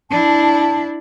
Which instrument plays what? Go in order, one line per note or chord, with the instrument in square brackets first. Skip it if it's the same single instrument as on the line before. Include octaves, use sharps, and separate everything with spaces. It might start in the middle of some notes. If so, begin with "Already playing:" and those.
[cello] D4 E4 [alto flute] A5